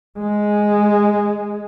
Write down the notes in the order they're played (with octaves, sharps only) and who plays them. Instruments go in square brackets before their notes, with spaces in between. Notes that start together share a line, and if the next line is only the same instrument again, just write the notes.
[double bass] G#3